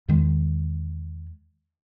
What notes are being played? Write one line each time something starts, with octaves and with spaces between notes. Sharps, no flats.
E2 D#3 G#3